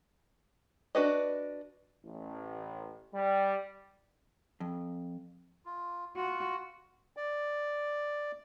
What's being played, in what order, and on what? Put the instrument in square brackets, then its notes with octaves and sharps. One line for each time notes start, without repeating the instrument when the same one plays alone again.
[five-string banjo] D4 F#4 B4 D#5
[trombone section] A1
G3
[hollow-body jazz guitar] F2
[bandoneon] F4
[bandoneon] F4 [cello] F#4
[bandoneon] D5